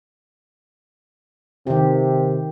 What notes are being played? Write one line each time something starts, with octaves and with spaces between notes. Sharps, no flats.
C3 D#3 G4